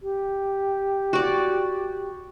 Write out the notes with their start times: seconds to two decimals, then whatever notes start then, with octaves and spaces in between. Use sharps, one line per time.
0.02 G4
1.13 F#4 D5